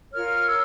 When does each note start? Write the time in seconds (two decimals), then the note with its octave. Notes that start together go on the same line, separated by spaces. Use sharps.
0.13 F4 A#4 C#5 F6
0.48 E6